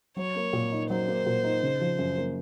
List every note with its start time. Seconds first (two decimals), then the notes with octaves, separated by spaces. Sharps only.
0.16 F#3 C#5
0.36 A#3
0.53 A#2
0.72 D#4
0.90 F#3 C5
1.08 A#3
1.26 A#2
1.44 D#4
1.63 C#3
1.80 F3
1.98 F#2
2.17 A#3